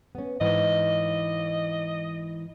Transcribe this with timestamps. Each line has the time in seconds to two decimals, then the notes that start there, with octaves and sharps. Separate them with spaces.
0.15 B3 C#4
0.40 G#2 E3 D#5